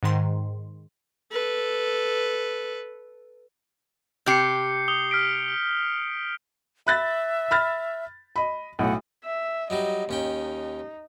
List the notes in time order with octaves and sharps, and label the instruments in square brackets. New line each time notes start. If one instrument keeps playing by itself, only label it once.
[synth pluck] G#2 D#3 C6
[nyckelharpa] A4 B4
[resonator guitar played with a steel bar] C3 G4 [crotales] G6 C7 C#7
[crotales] D#6 G7
F6 B6 D7
[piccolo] E5 [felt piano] B5 F#6 A6
[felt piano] B5 F6 A6
D#5 B5
[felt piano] B1 A2 [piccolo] F#5
[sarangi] E5
[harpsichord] F#3 G3 D#4 [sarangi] D#5
[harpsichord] D#2 C#4 G5 [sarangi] D#4